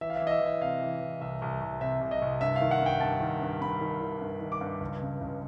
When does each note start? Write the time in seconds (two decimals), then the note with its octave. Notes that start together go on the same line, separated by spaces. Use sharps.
0.01 E3 E5
0.10 F5
0.16 E5
0.22 E3
0.27 D#5
0.31 E5
0.41 E3
0.46 E5
0.61 C3 F5
0.81 E3
1.01 E3
1.21 C2 E5
1.42 C2
1.61 C2
1.81 C3 E5
2.01 C2
2.11 D#5
2.22 C2
2.41 G2 E5
2.56 F5
2.61 D#3
2.71 F#5
2.81 G2 G5
3.01 G2 A5
3.21 D#3
3.41 G2
3.61 G2 B5
3.81 D#3
4.01 D#3
4.21 G2
4.41 D#3
4.52 D6
4.61 G2
4.81 C#2
5.02 C#3
5.21 C#2